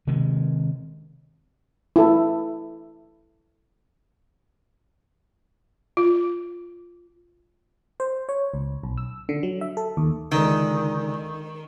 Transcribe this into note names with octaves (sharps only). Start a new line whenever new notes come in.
C3 D#3 G#3
E4 A4
F4
C5
C#5
C#2
B1
E6
D3
F#3
E5
A4
D#2
C#2 D3 D#3 D#4